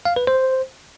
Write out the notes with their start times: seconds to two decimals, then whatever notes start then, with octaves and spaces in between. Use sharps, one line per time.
0.05 F5
0.16 B4
0.27 C5